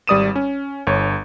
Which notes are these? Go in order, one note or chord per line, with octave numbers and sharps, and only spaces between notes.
G#1 G3 D5 D#6 D#7 E7
C#4
G1 C#5